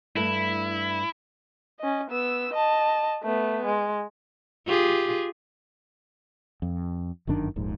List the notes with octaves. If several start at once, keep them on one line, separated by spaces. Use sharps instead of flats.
G2 A3 E4 A4
C#4 D#5
B3 E6
D#5 A5
A3 B3
G#3
F4 G4 G#4
F2
G1 F#2 D#3 D4
D#1 A#1 G#2